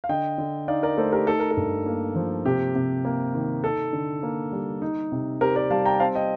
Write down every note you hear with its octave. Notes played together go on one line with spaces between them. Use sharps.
F5
D3 D#5 G5
D3
D#4 D5 F5
A#4 D5
A3 A4 C5
G4 A#4
D#4 A4
A#4
A4
G2
A#3
F3
C3 G4
C3
A#3
D#3
D#4 A4
D3
A#3
G3
D#4
C3
C4 G4 A#4
A#4 D5
G3 F5 A5
G5 A#5
C4 F5 A5
D#5 G5